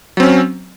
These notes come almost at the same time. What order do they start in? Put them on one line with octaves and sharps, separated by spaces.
F#3 C4 C#4